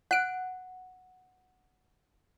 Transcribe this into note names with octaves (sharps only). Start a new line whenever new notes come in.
F#5 F#6 D7